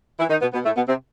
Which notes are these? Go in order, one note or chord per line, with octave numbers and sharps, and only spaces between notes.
E3 E4
D#3 D#4
B2 B3
B2 B3
A2 A3
B2 B3
C3 C4